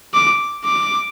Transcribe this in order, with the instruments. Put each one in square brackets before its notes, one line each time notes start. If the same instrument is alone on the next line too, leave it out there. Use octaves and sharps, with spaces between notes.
[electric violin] D6
D6